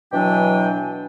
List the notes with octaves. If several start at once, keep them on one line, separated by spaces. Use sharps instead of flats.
B2 E3 F#3 D4 G5 G#5